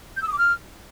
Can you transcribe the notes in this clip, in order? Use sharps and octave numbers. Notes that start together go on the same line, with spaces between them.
G6
E6
D#6
D6
F6